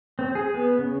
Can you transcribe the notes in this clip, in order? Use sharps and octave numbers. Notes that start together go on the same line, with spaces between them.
C4
G#4
B3
C#3